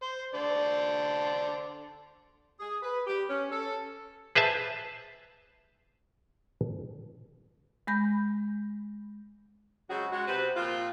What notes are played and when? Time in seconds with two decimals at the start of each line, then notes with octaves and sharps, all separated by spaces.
0.02 C5
0.34 D3 C5 D5
2.60 G#4
2.82 B4
3.07 G4
3.28 C#4
3.52 A4
4.35 G#4 B4 C5 E5 A5
7.87 G#3 B5 G6 A#6
9.90 C#3 F#3 G#3 C4 F#4 G#4
10.12 G#3 F#4
10.27 C3 B4 C5
10.56 A#2 F3 C4 F4